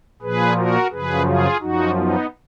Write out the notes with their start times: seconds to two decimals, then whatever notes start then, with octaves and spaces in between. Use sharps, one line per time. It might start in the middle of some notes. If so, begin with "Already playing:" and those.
0.22 A#2 F3 G#4 B4
0.56 F#4 A#4
0.91 F#2 C#3 F3 G#4 B4
1.26 F4 G#4
1.60 F#2 F3 D#4 F#4
1.95 B3 D#4